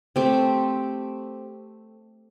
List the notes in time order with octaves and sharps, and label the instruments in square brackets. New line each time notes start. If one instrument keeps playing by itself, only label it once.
[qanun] A3 C4 G4